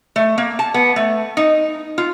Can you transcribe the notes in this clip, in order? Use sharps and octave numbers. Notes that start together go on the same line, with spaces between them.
A3
A#3
A5
B3
A3
D#4
F4